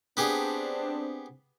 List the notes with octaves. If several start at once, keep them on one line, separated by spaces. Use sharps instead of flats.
B3 C4 D4 G4 G#4